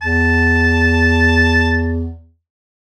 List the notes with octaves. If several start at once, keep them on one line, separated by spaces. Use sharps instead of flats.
E2 A5